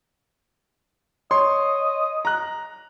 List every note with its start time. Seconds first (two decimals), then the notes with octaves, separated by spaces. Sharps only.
1.31 C#5 D#5 C6
2.25 A#5 F#6